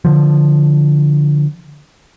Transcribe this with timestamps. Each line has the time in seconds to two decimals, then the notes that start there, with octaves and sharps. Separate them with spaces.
0.05 D3 F3